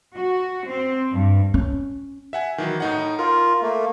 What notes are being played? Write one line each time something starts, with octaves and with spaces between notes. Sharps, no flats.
F#4
C4
G2
C#4
E5 F#5 G#5
D#3 E3 F#3
A2 D#4 F#5
F4 A#4
A3 A#3